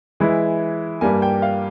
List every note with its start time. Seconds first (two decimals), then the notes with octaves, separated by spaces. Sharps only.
0.20 E3 G#3 E4
1.01 G2 G3 A#3 G#5
1.22 G5
1.42 F5